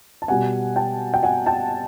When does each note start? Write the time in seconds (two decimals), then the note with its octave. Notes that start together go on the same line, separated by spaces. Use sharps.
0.22 A5
0.28 B2 G3 B3 F#5 G#5
0.76 G5 A5
1.14 G5
1.23 F#5 G#5
1.46 G5 A5